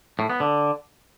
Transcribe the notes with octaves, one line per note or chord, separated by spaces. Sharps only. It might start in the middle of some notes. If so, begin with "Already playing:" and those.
A2
B3
D3